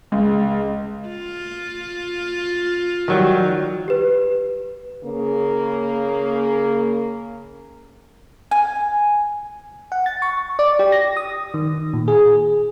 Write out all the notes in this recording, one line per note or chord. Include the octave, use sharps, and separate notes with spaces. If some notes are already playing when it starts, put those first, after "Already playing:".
C#2
F4
D#3 F#3 G3
G4 B4
C#3 A#3
G#5
F#5
A6
C#6
D5
G4
A#6
D#6
D#3
A#2
G#4